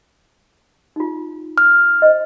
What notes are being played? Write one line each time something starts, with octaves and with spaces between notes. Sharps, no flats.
D#4 F4
F6
C5 D#5